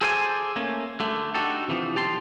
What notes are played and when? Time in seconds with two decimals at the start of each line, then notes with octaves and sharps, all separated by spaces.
0.01 G#4 A4 C5 D5 F5 G#5
0.56 A3 A#3 C#4
1.00 D3 A3
1.35 D4 D#4 F#4 G4 A4
1.68 C3 E3 F3
1.95 B1 G4 A5 C6